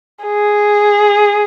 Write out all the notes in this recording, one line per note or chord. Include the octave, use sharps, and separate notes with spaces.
G#4